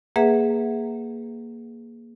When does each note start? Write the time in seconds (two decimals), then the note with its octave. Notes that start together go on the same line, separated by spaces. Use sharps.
0.16 A#3 G#4 B4 E5 F#5